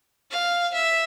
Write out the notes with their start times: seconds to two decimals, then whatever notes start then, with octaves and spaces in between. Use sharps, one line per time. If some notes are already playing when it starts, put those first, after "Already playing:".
0.31 F5
0.73 E5